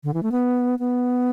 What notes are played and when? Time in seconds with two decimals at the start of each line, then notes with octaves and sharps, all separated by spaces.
0.04 D3
0.14 E3
0.23 A3
0.32 B3
0.79 B3